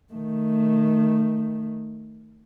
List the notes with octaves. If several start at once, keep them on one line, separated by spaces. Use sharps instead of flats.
D#3 A3